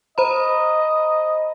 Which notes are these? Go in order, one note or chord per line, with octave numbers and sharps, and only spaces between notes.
C5 D#5 A#5 B5